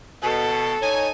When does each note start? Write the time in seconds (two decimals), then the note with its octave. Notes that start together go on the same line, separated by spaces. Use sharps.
0.23 B2 A4
0.81 D#4 C#5 G#5